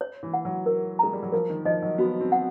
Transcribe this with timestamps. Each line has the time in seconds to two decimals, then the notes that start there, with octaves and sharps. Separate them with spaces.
0.01 C#5
0.23 E3
0.34 F#5
0.45 F#3
0.66 A#4
0.99 G#3 A#5
1.13 G3
1.23 F#3
1.32 F3 A#4
1.50 D#3
1.65 F3 D#5
1.82 F#3
1.98 B3 F#4
2.21 C4
2.32 F#5